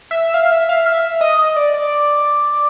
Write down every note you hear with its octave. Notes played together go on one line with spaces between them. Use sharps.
E5
F5
E5
F5
E5
D#5
D#5
D5
D5